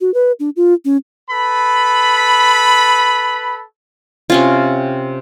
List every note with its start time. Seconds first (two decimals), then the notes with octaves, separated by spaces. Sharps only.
0.01 F#4
0.14 B4
0.40 D4
0.56 F4
0.85 C#4
1.29 A4 B4 B5
4.30 C3 C#4 F4